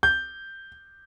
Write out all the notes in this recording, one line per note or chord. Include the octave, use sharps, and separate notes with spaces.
G6